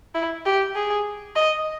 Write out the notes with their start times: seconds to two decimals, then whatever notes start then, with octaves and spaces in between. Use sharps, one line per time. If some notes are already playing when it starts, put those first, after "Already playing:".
0.15 E4
0.46 G4
0.75 G#4
1.35 D#5